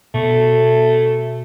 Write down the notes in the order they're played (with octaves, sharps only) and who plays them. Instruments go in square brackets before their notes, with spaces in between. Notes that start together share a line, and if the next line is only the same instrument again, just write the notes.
[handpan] B2 [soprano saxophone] A3